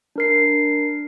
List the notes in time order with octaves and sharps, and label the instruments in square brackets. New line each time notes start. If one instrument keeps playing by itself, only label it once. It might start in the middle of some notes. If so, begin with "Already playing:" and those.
[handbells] D4 A#4 C7